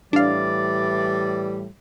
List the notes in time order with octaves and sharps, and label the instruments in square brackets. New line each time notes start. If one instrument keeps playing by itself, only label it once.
[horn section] A2 E3 G3 [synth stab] D4 F5 [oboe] D5